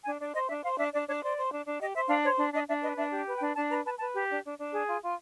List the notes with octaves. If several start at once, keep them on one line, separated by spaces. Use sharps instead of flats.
D4 G#5
D4 D5
C5 D#5
D4 E5
C5 F5
D4 E5
D4 D5
D4 C#5
C5 D5
C5
D4
D4
G4 D#5
C5 E5
D4 F5
C5 C#5
D4
D4 D#5
D4 E5
B4 D#5
D4 E5
G4
B4
G5
D4
D4 A5
B4 A#5
B4 A5
B4 A5
G4
D4
D4
D4
G#4
F4
F4